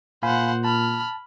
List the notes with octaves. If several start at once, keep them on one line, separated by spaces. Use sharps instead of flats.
A#2 C5 F5 F#5 G#5 B5
A5 B5 F6